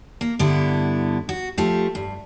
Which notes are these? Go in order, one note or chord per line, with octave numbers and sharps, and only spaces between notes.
A#3
G2 D3 B3 E4
F#4
F3 A3 G4
G2